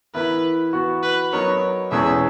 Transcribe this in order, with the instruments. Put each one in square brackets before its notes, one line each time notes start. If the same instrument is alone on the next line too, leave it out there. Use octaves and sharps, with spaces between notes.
[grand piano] E3 B3 E4 A#4 [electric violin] B4
[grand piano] E3 B3 F#4
[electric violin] B4
[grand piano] F#3 B3 D#4 A#4 [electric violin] C#5
[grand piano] E2 B2 G#3 C#4 G#4 [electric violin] E5